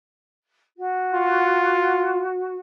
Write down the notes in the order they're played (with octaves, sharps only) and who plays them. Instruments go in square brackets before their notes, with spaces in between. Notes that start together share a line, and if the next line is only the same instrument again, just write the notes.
[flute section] F#4
[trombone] F4